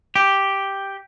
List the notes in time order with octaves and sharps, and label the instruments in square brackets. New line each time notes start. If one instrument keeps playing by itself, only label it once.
[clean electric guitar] G4